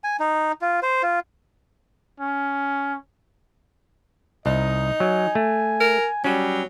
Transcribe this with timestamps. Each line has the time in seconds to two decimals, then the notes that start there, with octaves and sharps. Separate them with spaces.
0.04 G#5
0.20 D#4
0.61 F4
0.83 C5
1.03 F4
2.20 C#4
4.46 C2 D#4 D#5
5.00 F#3 G#5
5.35 A3
5.80 A#4
6.24 F#3 G3 C#4